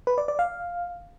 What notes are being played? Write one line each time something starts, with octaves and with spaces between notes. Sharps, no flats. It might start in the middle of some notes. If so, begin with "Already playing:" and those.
B4
D5
D5
F5